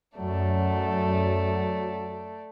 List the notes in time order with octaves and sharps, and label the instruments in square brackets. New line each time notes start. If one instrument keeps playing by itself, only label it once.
[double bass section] F#2 [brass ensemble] F#3 [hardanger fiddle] A3 D5